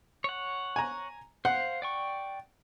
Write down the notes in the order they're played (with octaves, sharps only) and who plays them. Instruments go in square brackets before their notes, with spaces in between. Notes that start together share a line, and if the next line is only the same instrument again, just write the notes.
[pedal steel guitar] C#5 F#5
[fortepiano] G#5 A#5
[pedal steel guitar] C5 F5 [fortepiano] F#5
[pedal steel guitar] D5 G5 C#6